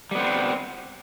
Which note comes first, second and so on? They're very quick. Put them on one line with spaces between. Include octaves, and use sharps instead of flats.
G3 B3 C4